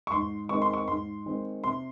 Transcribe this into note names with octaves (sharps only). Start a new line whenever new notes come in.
C#6
G#2 C6
D#3 G#3 C4 C#6
C6
C#6
G#2 C6
D#3 G#3 C4
C3 C6